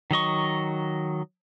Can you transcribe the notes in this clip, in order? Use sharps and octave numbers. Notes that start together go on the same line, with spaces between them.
D#3 F#3 D#5 C#6